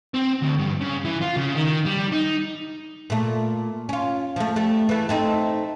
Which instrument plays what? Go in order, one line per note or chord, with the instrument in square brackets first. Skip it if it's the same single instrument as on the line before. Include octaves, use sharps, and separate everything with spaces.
[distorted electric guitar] C4
D2
G2
C#3
E3
F4
C#3
D#3
G3
D#4
[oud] A#2 A3
C#4 F4
F3 A3
G3 A3
E3 A3
A3 C4 D#4